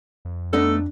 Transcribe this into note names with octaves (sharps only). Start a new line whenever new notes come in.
F2
A3 B3 D4 D#4 A4